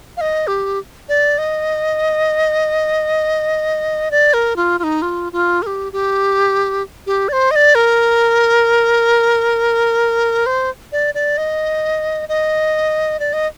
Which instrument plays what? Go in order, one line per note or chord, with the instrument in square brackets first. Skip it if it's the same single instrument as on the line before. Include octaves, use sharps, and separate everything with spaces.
[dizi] F5
D#5
G4
D5
D#5
D5
A#4
F4
F4
D#4
F4
F4
A#4
G4
G4
G4
D5
C5
D#5
D5
A#4
C5
D5
D5
D#5
D#5
D5
D#5